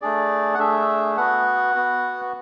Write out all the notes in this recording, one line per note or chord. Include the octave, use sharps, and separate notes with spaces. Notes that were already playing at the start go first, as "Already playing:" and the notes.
A3 D4 G#4 D5
F#5
A3 D4 G#4 E5
B3 F#4 F#5
B3 F#4